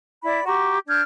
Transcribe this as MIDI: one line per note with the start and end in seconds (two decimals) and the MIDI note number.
0.24 0.43 64
0.24 0.43 74
0.24 0.43 83
0.45 0.78 66
0.45 0.78 67
0.45 0.78 82
0.45 0.78 85
0.87 1.02 62
0.87 1.02 89
0.87 1.02 91
0.87 1.02 92